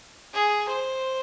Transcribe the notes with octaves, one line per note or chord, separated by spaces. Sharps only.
G#4
C5